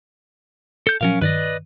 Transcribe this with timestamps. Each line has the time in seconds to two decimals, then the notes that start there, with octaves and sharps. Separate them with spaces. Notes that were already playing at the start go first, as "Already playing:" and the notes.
0.87 A4 G6
1.01 A#2 F3 F#3 C#4 A#4 F5
1.21 G2 D#3 B4 D5 D#5